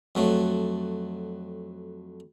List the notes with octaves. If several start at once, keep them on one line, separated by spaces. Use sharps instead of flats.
F2 F#3 A3